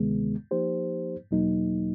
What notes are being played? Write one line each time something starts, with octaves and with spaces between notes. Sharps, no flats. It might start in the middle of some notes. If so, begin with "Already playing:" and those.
Already playing: D2 C3 D#3 G#3 B3
F3 A#3 D#4 G4 C5
E2 B2 F#3 A#3 D#4